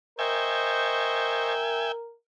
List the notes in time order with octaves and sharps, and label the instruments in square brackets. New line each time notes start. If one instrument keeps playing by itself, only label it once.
[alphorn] A#4 [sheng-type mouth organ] C5 D#5 C#6 [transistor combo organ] E5 G5 G#5